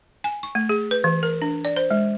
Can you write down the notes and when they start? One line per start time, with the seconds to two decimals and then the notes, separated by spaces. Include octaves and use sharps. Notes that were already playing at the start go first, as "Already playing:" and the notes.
0.24 G#5
0.43 C#6
0.55 A3
0.69 G#4
0.91 B4
1.04 E3
1.23 A#4
1.42 D4
1.65 D5
1.76 C5
1.91 G#3